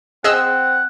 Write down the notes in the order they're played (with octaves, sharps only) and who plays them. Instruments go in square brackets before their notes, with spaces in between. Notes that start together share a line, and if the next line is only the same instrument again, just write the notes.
[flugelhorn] C4 [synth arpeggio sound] G#4 D#5 E6 [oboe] F#5